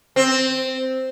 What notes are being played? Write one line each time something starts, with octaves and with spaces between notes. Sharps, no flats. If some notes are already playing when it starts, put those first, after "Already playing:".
C4